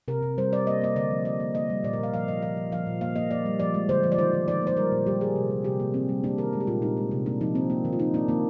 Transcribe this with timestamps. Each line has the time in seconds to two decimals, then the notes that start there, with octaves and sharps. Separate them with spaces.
0.08 C3 A#4
0.22 C3
0.38 G3 C5
0.52 G3 D5
0.67 A#3 D#5
0.82 A#3 D#5
0.96 D3 D5
1.11 F3
1.25 A#3 D#5
1.40 A#3
1.55 A#3 D#5
1.70 G3
1.84 A#2 D5
1.93 A#4
1.99 A#2 F5
2.13 F3 F5
2.28 F3 D#5
2.42 F3 F5
2.57 F3
2.72 F3 F5
2.87 A#2
3.01 A#3 F5
3.16 A#3 D#5
3.31 A#3 D5
3.46 G3
3.59 F3 D5
3.74 G#3
3.89 D3 C5
4.03 F3
4.12 D5
4.18 D#3 C5
4.33 D#3
4.48 D#3 D5
4.62 A#3 C5
4.77 G3 A#4
4.92 A#2
5.07 G3 G4
5.21 A#3 G#4
5.35 C3
5.50 G3
5.64 C3 G4
5.80 C3 A#3
5.94 A#3 C4
6.09 G3
6.24 A#3 D4
6.38 D#3 A#4
6.53 G#3
6.60 G4
6.67 A#2 F4
6.82 A#2 D#4
6.97 G#3
7.11 C3
7.26 A#3 D4
7.41 F3 D#4
7.55 A#3 C4
7.70 A#3
7.85 D#3
7.93 F4
7.99 D#3 D#4
8.14 A#3 D4
8.28 D#3 A#3